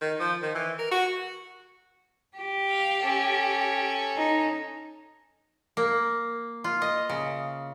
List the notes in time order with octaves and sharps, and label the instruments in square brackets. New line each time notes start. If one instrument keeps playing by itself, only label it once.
[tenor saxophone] D#3
F3
D#3
E3
A#4
F#4
[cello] G4
[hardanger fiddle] F5
C#4 A4
[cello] D#4
[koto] A#3
F4
D#5
C#3